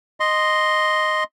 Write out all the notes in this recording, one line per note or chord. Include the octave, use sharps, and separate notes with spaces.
D#5 C6